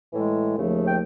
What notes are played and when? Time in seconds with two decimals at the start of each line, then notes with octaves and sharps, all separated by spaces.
0.13 A2 E3 G#3
0.55 D#2 C#3 F3 A3
0.87 G5